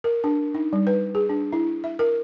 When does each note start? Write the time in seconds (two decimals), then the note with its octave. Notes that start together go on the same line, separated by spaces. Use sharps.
0.04 A#4
0.24 D4
0.54 D#4
0.73 G3
0.87 B4
1.15 G#4
1.30 D4
1.53 E4
1.84 E5
1.99 A#4